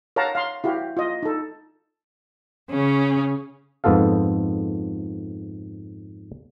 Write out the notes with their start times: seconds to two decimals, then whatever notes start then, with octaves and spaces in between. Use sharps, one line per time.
0.16 A#4 C#5 F5 F#5 A5 A#5
0.35 F5 C6
0.64 E4 F#4 G4 F5
0.97 F4 D#5
1.23 D#4 A4
2.69 C#3 C#4
3.84 F2 G#2 B3 F4 A4 F5